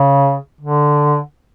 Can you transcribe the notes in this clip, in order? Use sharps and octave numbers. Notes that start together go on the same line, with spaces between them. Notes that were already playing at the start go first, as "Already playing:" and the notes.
Already playing: C#3
D3